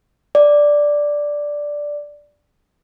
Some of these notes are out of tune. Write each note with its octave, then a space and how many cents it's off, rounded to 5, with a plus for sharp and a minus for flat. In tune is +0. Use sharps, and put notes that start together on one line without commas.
D5 +0